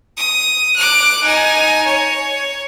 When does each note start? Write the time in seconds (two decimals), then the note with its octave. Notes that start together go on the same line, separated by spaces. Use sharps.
0.17 D#6
0.76 D6 F#6
1.24 D#4 G#5
1.86 C#5